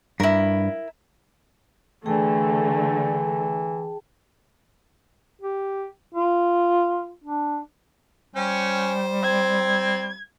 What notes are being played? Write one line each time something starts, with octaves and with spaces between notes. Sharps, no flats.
G2 E4 A#4
D3 E3 A3 G#4 G5 A5
G4
F4
D4
G3 C#4 C5 G5
C4 G#6